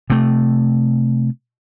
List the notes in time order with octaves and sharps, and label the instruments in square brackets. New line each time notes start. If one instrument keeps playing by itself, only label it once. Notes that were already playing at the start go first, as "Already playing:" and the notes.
[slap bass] C3 A3